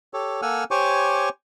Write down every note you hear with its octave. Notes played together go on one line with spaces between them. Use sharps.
G4 A4 C#5
A#3 A4 F#5 G#5 E6 F6
G4 C5 C#5 G#5 C#6 D6